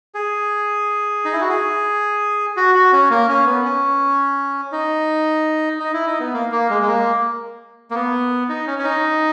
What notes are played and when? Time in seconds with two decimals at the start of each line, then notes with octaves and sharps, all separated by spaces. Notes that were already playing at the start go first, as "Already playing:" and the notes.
0.15 G#4
1.25 D#4
1.33 E4
1.41 F#4
1.49 G#4
2.57 F#4
2.75 F#4
2.92 C#4
3.10 A#3
3.29 C#4
3.46 B3
3.64 C#4
4.72 D#4
5.80 D#4
5.93 E4
6.06 D#4
6.20 B3
6.34 A#3
6.52 A#3
6.70 G#3
6.82 G#3
6.87 A#3
7.91 A#3
7.95 B3
8.49 D#4
8.67 C#4
8.79 C#4
8.84 D#4